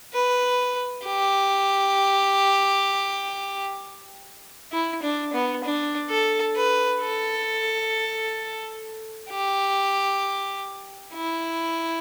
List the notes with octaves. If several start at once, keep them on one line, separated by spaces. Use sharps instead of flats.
B4
G4
E4
D4
B3
D4
A4
B4
A4
G4
E4